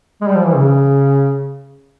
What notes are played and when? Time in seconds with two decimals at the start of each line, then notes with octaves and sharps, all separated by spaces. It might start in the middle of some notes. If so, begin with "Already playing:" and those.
0.21 G#3
0.27 G3
0.35 F3
0.45 E3
0.54 C#3